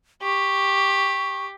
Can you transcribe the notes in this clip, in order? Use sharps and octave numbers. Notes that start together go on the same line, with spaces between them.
G4 C#6